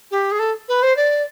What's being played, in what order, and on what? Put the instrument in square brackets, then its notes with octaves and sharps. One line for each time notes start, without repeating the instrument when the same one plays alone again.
[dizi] G4
G#4
A4
B4
C5
D5